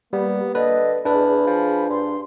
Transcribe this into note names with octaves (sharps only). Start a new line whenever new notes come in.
G3 A#3 B3
D3 B4 D#5
E2 D4 G#4 B4 B5
F3
G2 C6